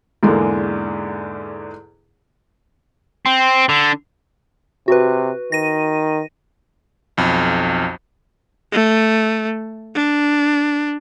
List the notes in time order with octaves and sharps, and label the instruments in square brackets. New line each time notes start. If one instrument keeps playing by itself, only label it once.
[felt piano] E2 G#2 D3 G#3 A#3
[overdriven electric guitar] C4
D3
[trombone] C3 [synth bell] F#4 B4
[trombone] D#3 [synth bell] A#6 D#7
[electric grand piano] B1 F2
[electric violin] A3
D4